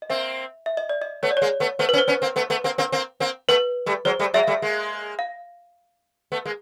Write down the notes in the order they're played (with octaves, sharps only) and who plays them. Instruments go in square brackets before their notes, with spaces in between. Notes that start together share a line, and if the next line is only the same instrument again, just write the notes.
[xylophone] D#5
[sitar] A#3 C4 [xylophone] E5
[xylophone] E5
D#5
D5
D#5
[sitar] A3 B3 [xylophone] C#5
[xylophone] D5
[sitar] G#3 A#3 [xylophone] C#5
[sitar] A3 B3
[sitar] A3 B3 [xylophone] C5
[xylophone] B4
[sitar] B3 C#4
[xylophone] C5
[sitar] B3 C#4
A#3 C4
A3 B3
A3 B3
A#3 C4
A#3 C4
A#3 C4
A#3 C4
[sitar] A3 B3 [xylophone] B4
[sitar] G3 A3
[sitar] F#3 G#3 [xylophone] C5
[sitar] G3 A3
[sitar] F#3 G#3 [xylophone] E5
[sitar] G3 A3 [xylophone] F5
[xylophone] E5
[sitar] G#3 A#3
[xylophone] F5
[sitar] A3 B3
G#3 A#3